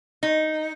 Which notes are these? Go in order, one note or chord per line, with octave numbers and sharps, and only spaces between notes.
D#4